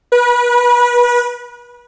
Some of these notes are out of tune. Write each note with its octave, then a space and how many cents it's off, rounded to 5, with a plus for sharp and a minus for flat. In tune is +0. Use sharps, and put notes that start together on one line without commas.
B4 -30